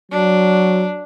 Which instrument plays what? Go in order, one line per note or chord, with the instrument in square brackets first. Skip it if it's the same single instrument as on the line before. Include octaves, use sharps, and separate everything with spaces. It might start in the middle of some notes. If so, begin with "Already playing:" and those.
[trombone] F#3 [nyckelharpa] D4